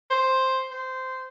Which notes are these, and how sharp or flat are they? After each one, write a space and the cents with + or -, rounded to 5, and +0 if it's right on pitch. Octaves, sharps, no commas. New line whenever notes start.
C5 +5
C5 -15